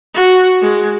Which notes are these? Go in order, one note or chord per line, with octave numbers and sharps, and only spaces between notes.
F#4
G#3